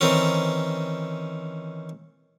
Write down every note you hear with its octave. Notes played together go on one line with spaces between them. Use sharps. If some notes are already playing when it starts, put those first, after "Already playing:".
D#3 E3 C4 C#4